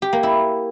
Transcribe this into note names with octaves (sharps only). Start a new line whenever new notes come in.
G4
A#3
E4